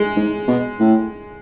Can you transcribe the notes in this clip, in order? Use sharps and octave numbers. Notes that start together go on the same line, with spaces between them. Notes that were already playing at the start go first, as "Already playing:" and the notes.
Already playing: G#3
G#2
B2
A2